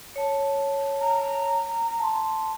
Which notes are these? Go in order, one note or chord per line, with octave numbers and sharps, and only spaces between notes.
C#5 A5
A#5
A5 C6